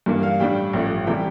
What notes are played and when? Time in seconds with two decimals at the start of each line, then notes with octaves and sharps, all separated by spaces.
0.06 G2 E3 A#3 D4
0.23 F5
0.40 A2 G3 D4 G5
0.73 A1 G2 F3 A3
1.07 C3 E3 G3 G5